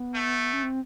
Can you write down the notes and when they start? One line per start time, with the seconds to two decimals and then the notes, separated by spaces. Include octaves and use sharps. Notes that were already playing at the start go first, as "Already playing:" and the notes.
Already playing: B3
0.14 A3
0.53 C#4
0.63 C4